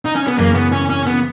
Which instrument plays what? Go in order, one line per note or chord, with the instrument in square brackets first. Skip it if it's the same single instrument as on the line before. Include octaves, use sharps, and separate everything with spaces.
[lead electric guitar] D#4
C#4
B3
[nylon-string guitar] F#2 C#3 E3 [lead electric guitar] A#3
[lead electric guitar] B3
C#4
C#4
B3